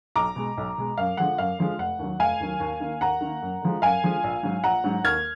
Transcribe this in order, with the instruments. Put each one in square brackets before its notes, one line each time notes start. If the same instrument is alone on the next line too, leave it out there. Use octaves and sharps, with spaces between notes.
[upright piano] B1 A#5 D6
B2 G#3
B1
B2 G#3
F#2 F5
D3 F3 G#3 F#5
F#2 F5
D3 F3 G#3
F1 F#5
D#2 D#3 F#3
F1 F5 G#5
D#2 D#3 F#3
D#2
D#3 A#3
D#2 F#5 A#5
D#3 A#3
F#2
D3 F3 G#3
F#2 F5 G#5
D3 F3 G#3
A#1
G#2 F#3
A#1 F#5 A#5
G#2 F#3
D#2 F6 G#6